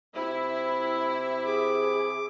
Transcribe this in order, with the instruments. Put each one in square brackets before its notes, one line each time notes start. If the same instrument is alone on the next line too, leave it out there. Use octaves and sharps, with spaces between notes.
[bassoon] C3 [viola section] E4
[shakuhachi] G#4 [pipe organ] D6